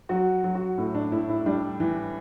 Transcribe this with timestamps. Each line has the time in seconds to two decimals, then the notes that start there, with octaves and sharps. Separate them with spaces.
0.09 F#3 F#4
0.44 F#3
0.55 F#4
0.78 A2 E4
0.95 D4
1.12 A2 E4
1.29 E4
1.46 G3 D4
1.80 E3